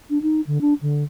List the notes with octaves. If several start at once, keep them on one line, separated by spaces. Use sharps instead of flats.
D4
D#4
D3
D4
D3